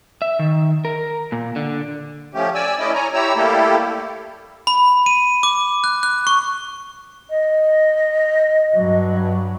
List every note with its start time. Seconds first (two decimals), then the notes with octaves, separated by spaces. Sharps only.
0.22 E5
0.39 D#3
0.85 A#4
1.32 A#2
1.56 D3
2.34 F3 A3 C#4 G4
2.55 D5 G#5 E6
2.79 A3 C#4 E4 D5 D#5
2.94 C#5 G#5 A#5
3.14 E4 G4 C#5 A#5 E6
3.36 G3 A3 A#3 E4 G4 A4
4.67 B5
5.06 D#7
5.43 D6
5.84 F#6
6.03 F#6
6.27 C#6
7.30 D#5
8.74 G2 F#3